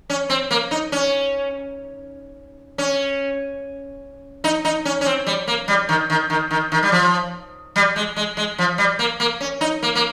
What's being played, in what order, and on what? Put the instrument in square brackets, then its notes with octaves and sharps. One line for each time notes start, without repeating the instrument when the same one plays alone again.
[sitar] C#4
C4
A#3
D#4
C#4
C#4
D#4
D#4
C#4
C#4
C4
G3
A#3
G3
D#3
D#3
D#3
D#3
D#3
G3
F3
G3
G#3
G#3
G#3
F3
G3
A#3
A#3
C#4
D#4
A#3
A#3